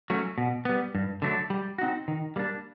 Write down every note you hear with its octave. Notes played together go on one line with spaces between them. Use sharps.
F#3 A3 C#4
B2
G3 B3
G2
D3 F#3 A3 D4
G3
C4 D#4 F#4
D#3
G3 A#3 D4